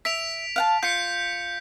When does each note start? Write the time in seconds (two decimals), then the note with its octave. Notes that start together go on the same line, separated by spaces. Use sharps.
0.05 E5 B6 D7 F7
0.56 F5 F#5 A5
0.83 F4 G6 B6 C#7